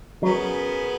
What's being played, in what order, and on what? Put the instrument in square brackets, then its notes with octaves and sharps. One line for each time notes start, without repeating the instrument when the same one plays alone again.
[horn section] F#2 C#3 B3 [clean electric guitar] F#3